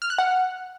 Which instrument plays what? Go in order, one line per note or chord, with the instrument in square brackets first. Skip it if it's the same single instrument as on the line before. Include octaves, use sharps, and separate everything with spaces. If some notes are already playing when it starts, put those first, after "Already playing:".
[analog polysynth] F6
F#6
F#5